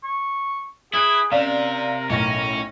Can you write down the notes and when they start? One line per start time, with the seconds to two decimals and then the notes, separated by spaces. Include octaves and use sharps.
0.04 C#6
0.94 E4 G#4 D#6 F#6 D7
1.32 C3 C#4 A#4 D5 F5
2.10 B1 A2 C#4 A#6